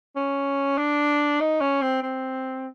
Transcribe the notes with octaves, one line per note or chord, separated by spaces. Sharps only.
C#4
D4
D#4
C#4
C4
C4